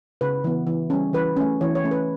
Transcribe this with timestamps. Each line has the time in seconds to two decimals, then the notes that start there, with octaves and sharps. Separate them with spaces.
0.21 C#3 B4
0.44 E3 B3
0.67 E3
0.90 G3 C#4
1.13 E3 B4
1.36 A3 C#4
1.61 E3 C#5
1.75 C#5
1.84 A3 C#4
1.91 B4